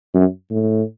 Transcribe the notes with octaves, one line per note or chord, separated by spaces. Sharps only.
F#2
A2